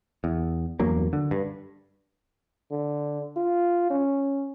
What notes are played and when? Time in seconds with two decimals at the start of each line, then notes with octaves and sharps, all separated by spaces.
0.24 E2
0.80 E2 G2 F#3 A#3
1.13 D3
1.31 G2
2.71 D3
3.37 F4
3.90 C#4